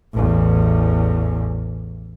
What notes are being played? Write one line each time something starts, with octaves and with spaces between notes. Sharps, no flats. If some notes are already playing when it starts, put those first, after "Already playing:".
A1 E2